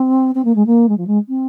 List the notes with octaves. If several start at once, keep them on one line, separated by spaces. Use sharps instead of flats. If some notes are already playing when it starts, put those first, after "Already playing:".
Already playing: C4
C4
A#3
G#3
A#3
G#3
F3
G#3
C4